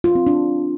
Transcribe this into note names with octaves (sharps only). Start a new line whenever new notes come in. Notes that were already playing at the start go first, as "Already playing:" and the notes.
F4
C4
D4